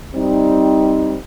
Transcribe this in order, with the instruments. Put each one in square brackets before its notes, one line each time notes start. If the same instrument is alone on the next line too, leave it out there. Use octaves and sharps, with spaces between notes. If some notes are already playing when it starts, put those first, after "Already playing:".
[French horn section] G3 C4 D#4